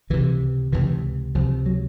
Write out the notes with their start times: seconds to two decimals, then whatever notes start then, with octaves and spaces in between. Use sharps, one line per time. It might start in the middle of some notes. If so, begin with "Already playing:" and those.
0.10 C#2 C3 E3
0.72 C#2 C3 E3
1.35 C#2 C3 F3
1.66 F#3